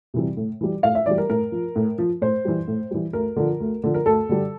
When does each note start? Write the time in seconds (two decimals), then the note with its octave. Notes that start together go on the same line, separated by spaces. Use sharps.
0.14 C3 E3 G3
0.37 A2
0.61 E3 G3
0.83 A2 F5
0.95 E5
1.06 E3 G3 D5
1.18 A#4
1.30 A2 A#4
1.52 F3
1.76 A2
1.98 F3
2.22 A2 C5
2.45 E3 G3
2.68 A2
2.91 E3 G3
3.13 D2 A#4
3.36 D3 F3
3.60 D2
3.83 D3 F3
3.94 A#4
4.06 D2 A4
4.29 D3 G3